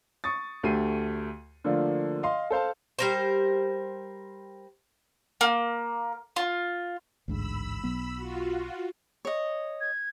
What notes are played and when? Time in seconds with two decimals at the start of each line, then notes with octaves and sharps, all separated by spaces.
0.24 C#6 D#6 A6
0.63 D2 A3 G4 C7 D#7
1.64 D3 F3 A3 A#3 D4 F4
2.23 D#5 F5 C6
2.50 A4 C5 F5 A5
2.99 G3 A#4 C5
5.41 A#3
6.36 F4
7.28 A1 D2 G#2 B5 E6
7.83 B1 F#3 B3
8.16 F4 F#4
9.25 C#5 D#5
9.81 G#6